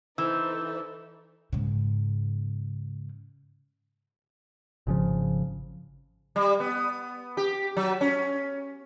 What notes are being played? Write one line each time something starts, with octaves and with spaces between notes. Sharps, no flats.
E3 D#4 A4 C5 E6
G#2 C#3
G#1 C#3 F3
G3
B3
G4
F#3
C#4